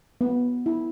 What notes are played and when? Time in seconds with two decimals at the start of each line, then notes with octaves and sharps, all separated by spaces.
0.21 B3
0.66 E4